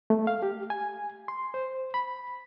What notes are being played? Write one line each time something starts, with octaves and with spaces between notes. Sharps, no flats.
A3
F5
G4
G#5
C6
C5
B5